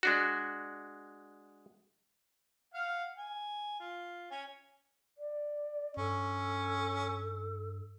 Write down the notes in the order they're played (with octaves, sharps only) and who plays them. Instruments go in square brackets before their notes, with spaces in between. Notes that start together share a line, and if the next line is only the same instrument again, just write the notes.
[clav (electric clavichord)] G#3 D4 F#4
[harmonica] F5 F#5 F6
G#5
F4
C#4 C#5 G#5
[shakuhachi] D5
[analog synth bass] G2 [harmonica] C#4 [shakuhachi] A4